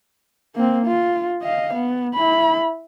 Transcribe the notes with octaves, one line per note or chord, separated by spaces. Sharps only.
A#3 C4
F4
D#5 F5
B3
E4 B5